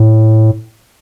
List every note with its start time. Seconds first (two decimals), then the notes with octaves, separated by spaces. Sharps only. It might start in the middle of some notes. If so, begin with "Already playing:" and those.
Already playing: A2